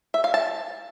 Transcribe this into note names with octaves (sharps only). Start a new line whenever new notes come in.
E5
F5
A5